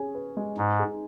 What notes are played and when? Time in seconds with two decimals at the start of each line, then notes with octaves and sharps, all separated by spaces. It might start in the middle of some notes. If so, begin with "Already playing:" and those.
Already playing: C#4 G#4
0.15 B4
0.37 G#3
0.57 G#2 D#4
0.79 G#4